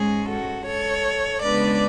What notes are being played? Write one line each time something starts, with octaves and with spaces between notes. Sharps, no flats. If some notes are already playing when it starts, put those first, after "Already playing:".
Already playing: G#2 G#3 C#4 G#4
F#4 A4
A4 C#5
C#3 G#3 B3 D4 B4 D5